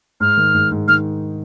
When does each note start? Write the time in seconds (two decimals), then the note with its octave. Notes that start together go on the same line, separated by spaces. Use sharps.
0.20 G#2 F6
0.37 D#3
0.54 G#2
0.71 G#2
0.88 D#3 F6